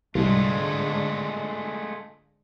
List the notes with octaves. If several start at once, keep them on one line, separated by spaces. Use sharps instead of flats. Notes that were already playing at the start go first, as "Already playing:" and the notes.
C2 G#2 D3 G#3 A3 F4